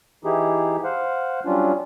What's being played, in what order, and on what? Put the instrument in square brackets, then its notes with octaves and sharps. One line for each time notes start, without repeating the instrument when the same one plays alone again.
[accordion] E3 D#4 E4 G4 G#4
C5 F5 F#5
F#3 G3 C#4 D4 F4